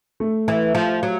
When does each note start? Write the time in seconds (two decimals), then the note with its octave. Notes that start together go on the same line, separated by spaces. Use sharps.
0.20 A3
0.48 E3
0.75 F3
1.03 F#3